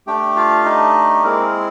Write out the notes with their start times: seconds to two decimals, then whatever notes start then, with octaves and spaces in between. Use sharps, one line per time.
0.07 A3 D4 G4 G5
0.36 F4 F5
0.65 D#4 D#5
1.23 G#3 A#3 C4 E4 G#4 A#4